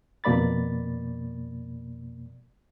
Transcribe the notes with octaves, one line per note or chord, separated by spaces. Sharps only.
F2 B2 A#3 D5 B5 A6